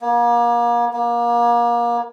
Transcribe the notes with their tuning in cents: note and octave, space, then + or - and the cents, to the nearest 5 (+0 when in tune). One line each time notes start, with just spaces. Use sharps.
A#3 +35
A#3 +30